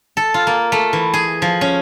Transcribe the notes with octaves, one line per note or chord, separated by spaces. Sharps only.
A4
F4
A#3
A3
E3
G#4
F3
C#4